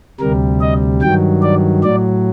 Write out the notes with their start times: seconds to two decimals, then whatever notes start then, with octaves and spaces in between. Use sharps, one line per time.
0.20 D2 C3 G3 A#4
0.61 D#5
1.02 G2 D#3 F#3 G5
1.43 D5
1.84 A2 F#3 D5